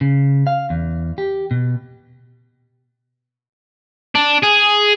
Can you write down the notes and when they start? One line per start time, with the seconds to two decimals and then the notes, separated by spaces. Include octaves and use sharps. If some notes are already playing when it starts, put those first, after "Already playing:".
0.01 C#3
0.47 F5
0.70 E2
1.18 G4
1.51 B2
4.15 D4
4.43 G#4